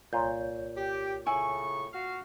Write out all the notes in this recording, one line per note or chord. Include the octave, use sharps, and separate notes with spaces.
C2 A#2 F4 C#5 G6
G4
A2 C#3 E4 G#5 C#6
F#4 F5